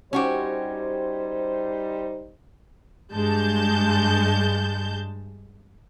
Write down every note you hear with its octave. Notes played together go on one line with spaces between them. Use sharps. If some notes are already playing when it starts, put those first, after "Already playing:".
G3 C#4 D#4 F#4 G4 C5
G2 G#3 A5 G6